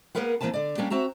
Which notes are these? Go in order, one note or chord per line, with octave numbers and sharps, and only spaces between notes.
A#3 B3 G#4 A#4 B4 F#5
E3 A#3 C4 B4 A5
D3 D5
G3 A#3 C#4 D4 G4
C4 F#4 E5 A#5